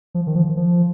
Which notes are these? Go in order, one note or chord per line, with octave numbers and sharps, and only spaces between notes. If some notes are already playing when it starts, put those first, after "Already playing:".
F3
D#3
F3
F3